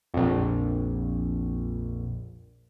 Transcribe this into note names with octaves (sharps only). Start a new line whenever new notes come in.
A#1 F2